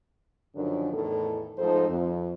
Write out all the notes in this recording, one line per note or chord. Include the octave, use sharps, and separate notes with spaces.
F#2 D3 D#3 F3 C#4 D4
E2 A2 D#3 A4
G#2 F3 A3 D#4 A4 C5
F2